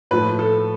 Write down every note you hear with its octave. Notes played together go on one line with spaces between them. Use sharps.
A2 F3 A3 B4
A4